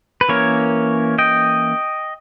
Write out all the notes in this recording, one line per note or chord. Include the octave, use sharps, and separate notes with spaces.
B4
E3 A#3 C#4 A#4 C#5
D#5 G5